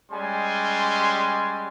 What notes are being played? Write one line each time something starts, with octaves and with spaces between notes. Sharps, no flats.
G3 G#3 C#4 G#5 C6